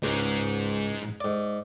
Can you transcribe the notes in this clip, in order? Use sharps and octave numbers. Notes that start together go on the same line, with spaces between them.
C#2 G#2
G#2 D5